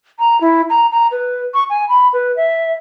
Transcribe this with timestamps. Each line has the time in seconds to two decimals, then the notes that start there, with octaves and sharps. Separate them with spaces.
0.19 A#5
0.41 E4
0.70 A#5
0.91 A#5
1.11 B4
1.54 C#6
1.70 G#5
1.89 B5
2.13 B4
2.36 E5